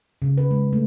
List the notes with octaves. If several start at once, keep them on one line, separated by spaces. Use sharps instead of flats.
C#3
B4
G#3
A3